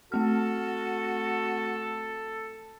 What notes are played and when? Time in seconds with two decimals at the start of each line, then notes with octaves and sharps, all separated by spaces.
0.12 A3 C4 F#4 A4 F6